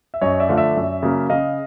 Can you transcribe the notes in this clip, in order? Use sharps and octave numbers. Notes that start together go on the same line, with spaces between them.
E5
F#2 C#5 D#5
D5 E5
D3 F3 A3 F5
D5 E5
F#2
C#3 F#3 A#3
C#3 D#5 F5